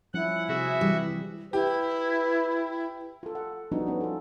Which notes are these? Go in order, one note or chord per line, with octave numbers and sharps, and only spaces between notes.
F3 G3 C#4 E4 F#5
C3 C4 F#4 G#4 E5
E3 G3
E4 G4 B4
F4 A4
F#5
F3 G3 B3 D4 D#4 F#4
B3 C#4
F4 A4